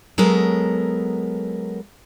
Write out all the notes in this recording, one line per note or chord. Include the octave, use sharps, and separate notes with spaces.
F#3 G#3 B3 A4 A#4